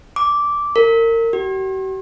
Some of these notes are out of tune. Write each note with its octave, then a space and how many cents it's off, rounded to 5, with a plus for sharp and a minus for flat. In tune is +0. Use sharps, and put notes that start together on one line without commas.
D6 -10
A#4 -30
G4 -45